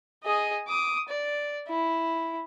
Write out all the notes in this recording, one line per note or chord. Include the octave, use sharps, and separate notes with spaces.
G#4 D#5
D6 D#6
D5
E4